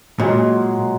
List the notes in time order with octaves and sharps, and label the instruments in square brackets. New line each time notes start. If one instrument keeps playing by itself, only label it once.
[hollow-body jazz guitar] A#2 [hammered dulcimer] F#3 G#3